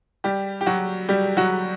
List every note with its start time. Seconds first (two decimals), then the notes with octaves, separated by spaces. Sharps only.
0.24 G3 G4
0.61 G4
0.66 F#3 F#4
1.09 G3 G4
1.37 F#3 F#4